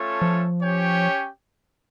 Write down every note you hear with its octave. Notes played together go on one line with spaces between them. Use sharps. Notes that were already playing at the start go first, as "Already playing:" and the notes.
Already playing: A3 C#4 F4 A4 C#5
F3
C#4 G4 C#5 G5